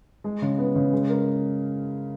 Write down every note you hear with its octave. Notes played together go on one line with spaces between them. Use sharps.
G#3
C#3
B3
C#3
G#3
A#4